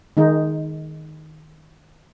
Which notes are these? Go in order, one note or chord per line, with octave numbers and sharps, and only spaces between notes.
D#3 G#3 D#4